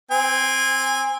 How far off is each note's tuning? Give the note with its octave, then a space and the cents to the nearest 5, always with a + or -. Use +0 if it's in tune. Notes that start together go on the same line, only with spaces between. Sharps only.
C4 +0 G#5 -20